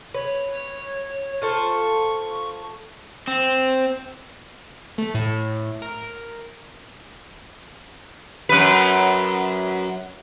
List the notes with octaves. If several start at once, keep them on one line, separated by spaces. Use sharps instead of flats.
B4 C#5
F4 A4 C5 C#6
C4
A3
A2
A#4
F#2 B4